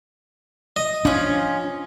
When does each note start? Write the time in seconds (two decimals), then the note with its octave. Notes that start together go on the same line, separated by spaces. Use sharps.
0.76 D#5
1.05 F3 C#4 D4